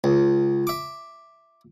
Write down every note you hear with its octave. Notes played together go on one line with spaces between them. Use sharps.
C#2
E5 D6